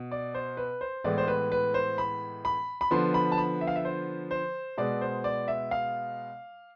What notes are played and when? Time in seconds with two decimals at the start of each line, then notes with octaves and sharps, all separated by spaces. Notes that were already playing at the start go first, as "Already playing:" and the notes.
Already playing: B2
0.11 D5
0.34 C5
0.57 B4
0.81 C5
1.04 A2 E3 G#3 B3 D5
1.18 C5
1.28 B4
1.52 B4
1.74 C5
1.98 B5
2.45 B5
2.81 B5
2.91 D3 F3 B3 C6
3.14 B5
3.32 A5
3.38 B5
3.61 E5
3.67 F5
3.76 E5
3.85 C5
4.31 C5
4.77 B2 G#3 B3 D5
5.01 C5
5.24 D5
5.48 E5
5.71 F5